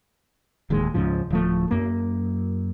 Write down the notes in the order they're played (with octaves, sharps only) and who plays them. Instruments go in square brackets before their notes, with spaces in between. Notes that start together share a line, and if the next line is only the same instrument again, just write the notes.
[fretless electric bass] D1 D#2 G#2 G#3
C#2 G#2 C#3 F3
D1 F3 A3
F#2 A#3